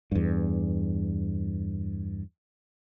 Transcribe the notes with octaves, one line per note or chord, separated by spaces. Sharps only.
E2 G2